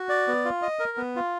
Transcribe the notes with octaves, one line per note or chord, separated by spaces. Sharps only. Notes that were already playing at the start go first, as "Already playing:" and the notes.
Already playing: F#4
D5
B3
F4
D#5
A#4
B3
F4